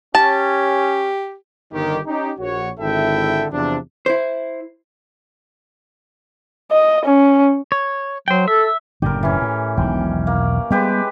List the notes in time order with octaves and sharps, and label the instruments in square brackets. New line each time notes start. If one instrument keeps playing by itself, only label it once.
[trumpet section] C#4 [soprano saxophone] G4 [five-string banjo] A5
[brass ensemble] G1 D#3 G4
C#4 D#4 G4
A#1 F#4 C#5
G#1 D3 E4 A4 E5 G5
E2 C3 F3 D4
[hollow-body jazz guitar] E4 C5
[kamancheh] D#5
C#4
[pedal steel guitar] C#5
[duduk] F#3 [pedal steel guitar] C5 G5
[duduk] A4 [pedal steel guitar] E5
[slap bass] F#1 A2 D3 [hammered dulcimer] G4 A#4
[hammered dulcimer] E3 C#4
[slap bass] A2
[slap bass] E1 B1 D#3 [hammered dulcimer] G5
[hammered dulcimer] A#3
[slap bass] G3 B3 [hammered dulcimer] G#3 G4 B4